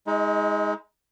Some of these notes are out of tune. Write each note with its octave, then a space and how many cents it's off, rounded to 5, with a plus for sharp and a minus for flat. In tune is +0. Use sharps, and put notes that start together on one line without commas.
G#3 +0 D#4 +35